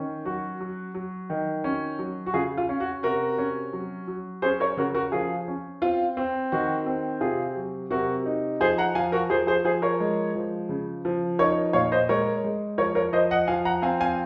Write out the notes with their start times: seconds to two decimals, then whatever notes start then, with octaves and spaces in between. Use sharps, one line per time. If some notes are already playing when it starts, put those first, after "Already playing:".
Already playing: D#3 C#4
0.25 F#3 F#4
0.60 F#3
0.95 F#3
1.30 D#3
1.64 C#4
1.99 F#3
2.26 F#4
2.34 C#3 F4 G#4
2.57 F4
2.69 C#4
2.80 F#4
3.03 C3 F#4 A#4
3.38 C#4
3.73 F#3
4.08 F#3
4.42 C#4 G#4 C5
4.60 A#4 C#5
4.77 C#3 F#4 A#4
4.94 F#4 A#4
5.12 F3 F4 G#4
5.48 C#4
5.82 C4 F4
6.17 C4
6.52 D#3 F#4
6.86 C4
7.21 C3 F4 G#4
7.56 F#3
7.90 C3 F#4 A#4
8.26 D#4
8.60 F3 G#4 C5
8.78 F#5 A#5
8.95 F3 F5 G#5
9.12 F#4 A#4
9.30 F3 G#4 C5
9.47 G#4 C5
9.64 F3 G#4 C5
9.82 A#4 C#5
10.00 G#3
10.35 F3
10.69 C#3
11.05 F3
11.39 D#4 A#4 C#5
11.73 A#2 C#5 F5
11.92 C5 D#5
12.09 G#3 A#4 C#5
12.44 G#3
12.78 F3 A#4 C#5
12.95 A#4 C#5
13.13 F3 C5 D#5
13.31 D#5 F#5
13.48 F3 F5 G#5
13.65 F#5 A#5
13.82 C4 F5 G#5
14.00 F5 G#5